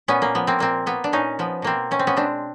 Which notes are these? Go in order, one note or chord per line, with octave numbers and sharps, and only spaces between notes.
A#2 B3 C#4
A#3
F3 B3
A#3 C4
A#2 A#3 C4
A#3 B3
D4
A#2 C#4 D#4
F3 B3
B2 A#3 C4
B2 C#4
C4
B3 C#4
G#3 C4 D4